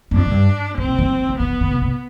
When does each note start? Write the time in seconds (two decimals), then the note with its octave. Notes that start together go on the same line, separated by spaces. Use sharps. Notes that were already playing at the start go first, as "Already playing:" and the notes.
0.11 G2
0.15 F2 D4
0.25 G#2
0.31 G2
0.77 G#2 C4
0.88 B2
0.98 D#3
1.09 F3
1.19 D#3
1.29 D3
1.39 D3 B3
1.50 F3
1.61 D3
1.71 C3
1.81 B2